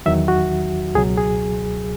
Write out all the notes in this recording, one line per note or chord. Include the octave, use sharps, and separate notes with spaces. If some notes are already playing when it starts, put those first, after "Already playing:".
E2 D#3 F#3 E5
F#4
C#2 B2 F#3 G#4
G#4